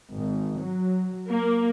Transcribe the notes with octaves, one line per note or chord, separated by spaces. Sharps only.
G#1
F#3
A#3